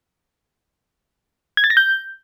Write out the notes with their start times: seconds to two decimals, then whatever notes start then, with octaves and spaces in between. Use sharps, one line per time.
1.57 G#6
1.64 A6
1.70 A#6
1.77 G6